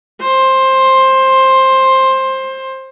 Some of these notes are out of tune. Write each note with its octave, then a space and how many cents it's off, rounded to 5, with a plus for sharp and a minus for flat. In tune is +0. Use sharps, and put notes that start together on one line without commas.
C5 +15